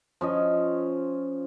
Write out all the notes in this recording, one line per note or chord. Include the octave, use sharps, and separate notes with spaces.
F3 C#4 D#5